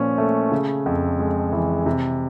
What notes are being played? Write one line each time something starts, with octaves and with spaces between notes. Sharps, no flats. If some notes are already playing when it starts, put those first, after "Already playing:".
Already playing: A#2 F3 C#4
A3
C#3
F2
G#3
E3
C3